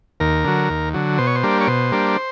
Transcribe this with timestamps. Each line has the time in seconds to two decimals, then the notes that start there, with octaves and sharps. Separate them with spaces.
0.20 D#2 A#4
0.44 D3 F#3
0.70 D#2
0.94 D3 F#3
1.18 B2 C5
1.27 C#5
1.35 C5
1.43 G3 A#3 D4
1.61 C#5
1.67 B2 C5
1.92 G3 A#3 D4